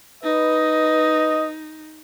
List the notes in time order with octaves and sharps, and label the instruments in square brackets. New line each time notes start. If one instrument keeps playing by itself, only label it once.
[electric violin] D#4 [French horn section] B4 [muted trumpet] D#5